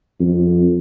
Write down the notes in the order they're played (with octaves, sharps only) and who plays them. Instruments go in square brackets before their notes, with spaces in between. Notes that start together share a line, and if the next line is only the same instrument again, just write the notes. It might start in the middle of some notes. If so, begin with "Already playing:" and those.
[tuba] F2